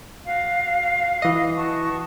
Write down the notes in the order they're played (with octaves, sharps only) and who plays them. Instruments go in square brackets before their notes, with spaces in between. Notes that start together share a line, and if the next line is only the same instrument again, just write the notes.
[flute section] F#4 F5
[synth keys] E3 D#5
[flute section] F#4 A5 C#6